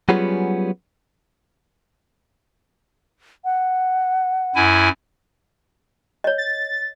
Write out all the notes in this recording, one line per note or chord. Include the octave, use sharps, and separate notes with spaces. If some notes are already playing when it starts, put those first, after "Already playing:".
F#3 G3 B3 C#4 F4 G#4
F#5
F#2 E4 G#5
C#5 D#5
A6